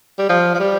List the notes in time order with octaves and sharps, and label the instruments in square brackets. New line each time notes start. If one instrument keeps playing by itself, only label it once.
[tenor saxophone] G3
F3
F3
G3